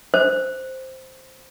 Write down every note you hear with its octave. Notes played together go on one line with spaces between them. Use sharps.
C5